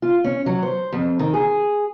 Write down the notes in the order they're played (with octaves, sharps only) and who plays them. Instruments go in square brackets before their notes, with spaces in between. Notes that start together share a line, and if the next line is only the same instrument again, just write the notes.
[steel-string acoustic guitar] F4
C#4
F#3
C5
F2
D#3
G#4